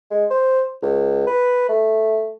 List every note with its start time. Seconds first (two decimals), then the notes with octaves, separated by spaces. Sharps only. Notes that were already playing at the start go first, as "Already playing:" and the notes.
0.11 G#3
0.30 C5
0.82 C#2
1.27 B4
1.69 A3